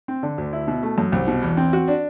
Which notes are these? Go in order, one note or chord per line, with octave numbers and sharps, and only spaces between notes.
C4
D3
D2
E4
B2
A3
F#2
C2
B2
E2
C4
F#4
D4